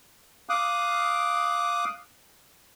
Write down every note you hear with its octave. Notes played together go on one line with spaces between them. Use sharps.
F5 D6 D#6 F#6